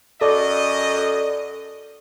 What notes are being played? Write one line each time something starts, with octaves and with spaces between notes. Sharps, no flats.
F#2 A4 D5 D#5